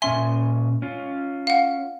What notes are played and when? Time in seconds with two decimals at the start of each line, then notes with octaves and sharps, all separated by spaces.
0.02 A#2 C#4 E5 G#5 C6
0.82 C#4 F4
1.47 F5 F#5